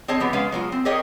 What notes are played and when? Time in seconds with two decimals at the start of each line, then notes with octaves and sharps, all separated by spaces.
0.08 C4 G#4 C#5 D#5 A5
0.20 F3 B3 G4
0.33 G#3 B3 C#4 F5
0.52 F#3 G#3 F4
0.72 C4
0.85 G4 G#4 A#4 C#5 D#5 G5